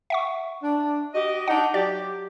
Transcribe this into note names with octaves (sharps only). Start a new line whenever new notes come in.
E5 F#5 C#6
D4
F#4 G4 D#5
D4 D#4 F#5
F#3 G4 D5